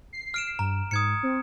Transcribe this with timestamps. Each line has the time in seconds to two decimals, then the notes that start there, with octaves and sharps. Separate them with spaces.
0.13 C7
0.34 F6 D7 E7
0.59 G2 A#5
0.91 G#2 D#6 G#6 C#7
1.23 C4